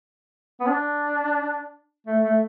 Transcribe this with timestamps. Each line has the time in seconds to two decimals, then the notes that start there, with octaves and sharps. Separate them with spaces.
0.60 B3
0.67 D4
2.07 A3
2.24 A3